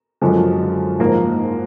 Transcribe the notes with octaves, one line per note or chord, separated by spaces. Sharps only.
F#2 D3 F3 G#3
G#2 F3 A#3